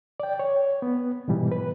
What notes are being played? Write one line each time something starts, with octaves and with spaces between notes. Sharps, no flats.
D5 G5
C#5
B3
G#2 B2 E3 G3
B4